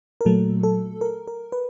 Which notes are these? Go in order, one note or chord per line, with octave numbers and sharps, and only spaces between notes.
A#4
A#2 F#3 A3 A4
A4
A#4
A#4
B4